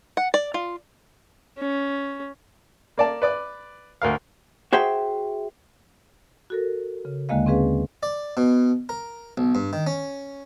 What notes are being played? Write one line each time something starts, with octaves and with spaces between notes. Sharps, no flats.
F#5
D5
F4
C#4
A#3 D5 A5
B4 D5 D6
D2 A#4 F5
F#4 G#4 C5 E5 G5
F#4 A4 A#4
C#3
D#2 D3 G#3 A#3 D#5 F5
C4 C#4 G#4 B4 F5
D5
B2
A#4
B1
G2
D#3
C#4